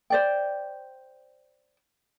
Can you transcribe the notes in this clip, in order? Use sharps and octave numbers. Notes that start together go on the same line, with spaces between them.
C5 D5 G5